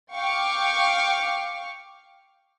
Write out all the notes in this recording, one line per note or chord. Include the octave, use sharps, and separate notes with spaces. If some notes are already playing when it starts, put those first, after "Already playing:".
F5 G5 C#6 D6 F6 C#7